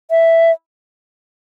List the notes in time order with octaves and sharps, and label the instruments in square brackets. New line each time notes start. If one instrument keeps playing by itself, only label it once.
[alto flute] E5